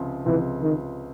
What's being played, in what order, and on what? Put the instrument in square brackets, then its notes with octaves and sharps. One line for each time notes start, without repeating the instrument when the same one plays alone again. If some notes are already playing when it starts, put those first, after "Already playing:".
Already playing: [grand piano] C#2 C3 F3
[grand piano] C#2 C3 F3 [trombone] E3
[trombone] D#3